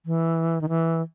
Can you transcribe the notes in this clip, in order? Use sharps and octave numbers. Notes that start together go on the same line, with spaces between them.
E3
D#3
E3